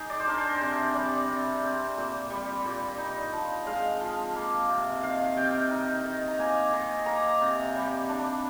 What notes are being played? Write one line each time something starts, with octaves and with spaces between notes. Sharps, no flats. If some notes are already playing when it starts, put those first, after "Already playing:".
Already playing: D#4 G#4
D5
C5
D4 A#4
C5
C3
G3 D5
C3
C4
A#2
G3
A#2
D#4
F3
G#3 F5
F3
A#3
C3
D#3 F5
C3 G5
D#4
D#3
A#5
A#3 G#5
D#3
A#3 A#5
C3
G3
D4